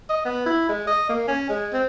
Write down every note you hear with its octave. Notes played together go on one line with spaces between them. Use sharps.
D#5
B3
E4
G#3
D#5
A#3
C#4
G#3
C4